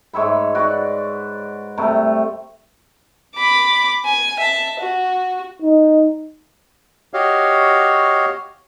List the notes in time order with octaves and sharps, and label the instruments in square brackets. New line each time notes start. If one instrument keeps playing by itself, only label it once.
[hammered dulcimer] G#2 C#5 E5 B5
F#4 B4 D5
G2 C3 A3
[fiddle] B5 D6
G#5
E5 A5
F#4
[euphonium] D#4
[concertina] F#4 G4 C#5 D#5 F5